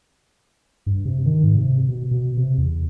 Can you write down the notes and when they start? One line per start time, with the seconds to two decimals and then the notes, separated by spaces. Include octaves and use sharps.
0.86 G2
1.05 C3
1.26 D#3
1.44 G#2
1.57 C3
1.89 B2
2.11 B2
2.37 C3
2.58 E2